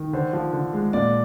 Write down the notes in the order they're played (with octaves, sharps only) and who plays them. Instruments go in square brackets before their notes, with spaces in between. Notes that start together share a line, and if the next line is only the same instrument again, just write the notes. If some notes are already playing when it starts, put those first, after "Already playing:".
Already playing: [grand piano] D#3
D3 C5
F3
D3
G#3
A#2 D5